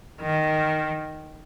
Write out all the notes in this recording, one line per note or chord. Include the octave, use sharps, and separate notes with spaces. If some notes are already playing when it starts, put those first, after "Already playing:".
D#3